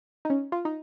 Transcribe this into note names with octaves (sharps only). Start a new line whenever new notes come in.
D#4
C#4
F4
D#4